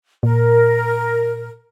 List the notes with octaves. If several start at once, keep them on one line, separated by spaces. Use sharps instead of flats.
A#2 A#4